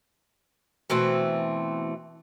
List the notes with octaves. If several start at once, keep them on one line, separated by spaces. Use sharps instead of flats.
B2 E3 A3 C4